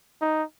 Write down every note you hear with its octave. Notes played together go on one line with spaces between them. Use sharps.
D#4